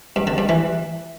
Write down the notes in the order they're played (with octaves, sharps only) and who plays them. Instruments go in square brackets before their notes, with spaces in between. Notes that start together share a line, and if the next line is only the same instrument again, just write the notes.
[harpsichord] G2
D3
G2
E3